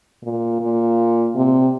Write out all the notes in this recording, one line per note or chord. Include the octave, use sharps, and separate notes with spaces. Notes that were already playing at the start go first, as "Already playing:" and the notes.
A#2
A#2
C3